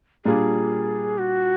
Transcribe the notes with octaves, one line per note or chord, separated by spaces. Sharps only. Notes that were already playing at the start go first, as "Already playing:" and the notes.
A#2 G3 A#3 D4 F4 G#4
F#4